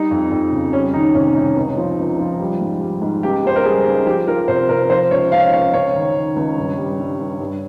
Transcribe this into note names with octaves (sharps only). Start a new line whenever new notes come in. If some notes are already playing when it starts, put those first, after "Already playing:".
Already playing: G3 D#4
F2
F2
C#3
G3 C#4
D#3 D#4
C3 C#4
C2 D#4
C#2
F3
C#2
F3
G3
G#2
G3
G#2
C#2 G4
C#2 C5
A#4
G3 G#4
C#2
F3 G4
F3 A#4
C3 C5
C3 A#4
F3 C5
C#2 C#5
C#2 F5
C#2 C#5
C#2 C#5
D#3
D#3
C#2
G2
G3
G2
G2
G2